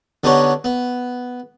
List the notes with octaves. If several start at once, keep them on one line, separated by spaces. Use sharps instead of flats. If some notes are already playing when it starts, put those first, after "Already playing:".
D3 B3 D#4 G4 C#5
B3